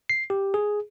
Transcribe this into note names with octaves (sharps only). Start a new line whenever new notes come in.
C7
G4
G#4